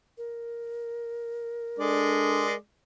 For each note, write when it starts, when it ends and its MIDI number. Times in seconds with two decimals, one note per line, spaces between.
0.18 2.56 70
1.79 2.54 56
1.79 2.46 62
1.79 2.46 69
1.79 2.54 74